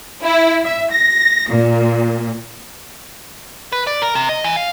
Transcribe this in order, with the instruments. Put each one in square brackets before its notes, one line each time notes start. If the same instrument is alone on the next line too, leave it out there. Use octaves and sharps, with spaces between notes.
[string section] E4
E5
A#6
A#2
[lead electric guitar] B4
D5
A#4
C3
D#5
E3
F5